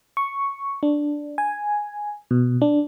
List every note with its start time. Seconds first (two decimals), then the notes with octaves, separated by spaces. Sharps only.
0.17 C#6
0.83 D4
1.38 G#5
2.31 B2
2.62 D4